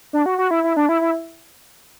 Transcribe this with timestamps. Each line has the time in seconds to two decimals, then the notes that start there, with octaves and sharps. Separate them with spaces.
0.13 D4
0.26 F#4
0.38 F#4
0.51 E4
0.64 E4
0.77 D4
0.89 E4
1.01 E4